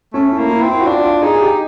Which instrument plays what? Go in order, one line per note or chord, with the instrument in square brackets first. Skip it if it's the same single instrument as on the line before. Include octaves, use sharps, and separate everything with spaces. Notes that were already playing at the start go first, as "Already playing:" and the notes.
[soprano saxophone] A3 [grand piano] C#4
[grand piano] E4
[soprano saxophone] A#3
[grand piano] E4
[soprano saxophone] C4
[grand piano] E4
F#4
[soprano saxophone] D4 [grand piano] F4
[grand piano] F4
[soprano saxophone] D#4 [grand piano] G#4
[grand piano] G#4
G4